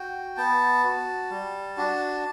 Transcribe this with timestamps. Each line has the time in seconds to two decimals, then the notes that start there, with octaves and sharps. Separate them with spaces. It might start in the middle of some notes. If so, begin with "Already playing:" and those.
Already playing: F#4 G5
0.37 B3 A5
0.84 F#4
1.30 G3
1.77 D4 F#4